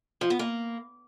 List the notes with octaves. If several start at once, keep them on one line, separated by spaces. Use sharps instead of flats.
F3
B3
A#3